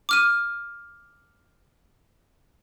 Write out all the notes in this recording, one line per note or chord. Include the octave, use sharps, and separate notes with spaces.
D6 F6 D#7